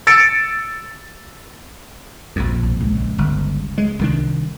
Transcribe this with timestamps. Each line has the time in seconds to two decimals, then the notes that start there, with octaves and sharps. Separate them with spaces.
0.07 E6 A6 C#7 D7
2.36 A#1 F2
2.63 B1
2.81 C#2
3.18 G1
3.78 G#3
3.99 C2 D#3 D4